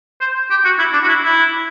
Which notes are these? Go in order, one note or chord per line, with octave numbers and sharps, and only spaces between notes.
C5
G4
F#4
E4
D4
F#4
E4
E4